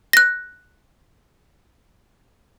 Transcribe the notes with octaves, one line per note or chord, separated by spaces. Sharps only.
F#6 A#6